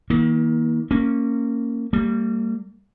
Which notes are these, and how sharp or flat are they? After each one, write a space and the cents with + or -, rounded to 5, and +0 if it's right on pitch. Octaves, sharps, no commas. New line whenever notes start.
D#3 +45 A#3 +20
A#3 -15 C#4 -15
G3 +0 A#3 -40